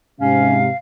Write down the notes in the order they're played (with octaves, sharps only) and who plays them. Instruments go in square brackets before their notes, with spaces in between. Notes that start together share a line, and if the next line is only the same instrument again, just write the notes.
[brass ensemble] G#2 C3 [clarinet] C#4 [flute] F5